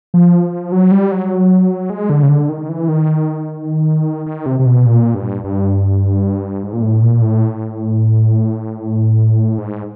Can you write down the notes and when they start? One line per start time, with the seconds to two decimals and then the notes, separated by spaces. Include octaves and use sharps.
0.14 F3
0.72 F#3
0.92 G3
1.11 F#3
1.90 G#3
2.10 D3
2.23 C#3
2.29 D3
2.49 D#3
2.69 E3
2.88 D#3
4.26 D#3
4.46 C3
4.59 C3
4.66 B2
4.86 A#2
5.14 G2
5.44 G2
6.63 G#2
6.73 A#2
6.82 A2
7.02 A#2
7.22 A2
9.58 G#2